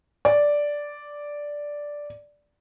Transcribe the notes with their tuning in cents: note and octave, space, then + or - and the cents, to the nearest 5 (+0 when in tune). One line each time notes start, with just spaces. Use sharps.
D5 -5